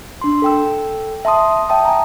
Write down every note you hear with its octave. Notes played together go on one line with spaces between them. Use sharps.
D4 C6
A4 G5 E6
E5 A5 C6 D#6
E5 G5 A5 D#6
G#5 A#5